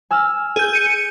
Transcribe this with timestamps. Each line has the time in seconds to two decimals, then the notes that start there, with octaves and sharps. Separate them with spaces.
0.11 G#5 E6 F6
0.56 G#4 G6
0.73 C#7 D#7